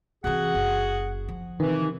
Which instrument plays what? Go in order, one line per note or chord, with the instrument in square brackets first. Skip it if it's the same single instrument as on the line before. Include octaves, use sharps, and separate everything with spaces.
[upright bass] C3 E3 [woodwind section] F#4 G#4 F#5
[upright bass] F#1
F3
[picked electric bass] C3 D#3 [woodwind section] E3